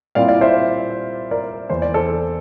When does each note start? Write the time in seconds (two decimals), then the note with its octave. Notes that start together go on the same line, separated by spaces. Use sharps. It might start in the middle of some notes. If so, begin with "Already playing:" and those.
0.15 A#2 G3 C4 E4 D5 F5
0.28 D5 F5
0.41 C5 E5
1.31 A#4 D5
1.69 E2 E3 A#3 E4 C5
1.82 D5
1.94 A4 C5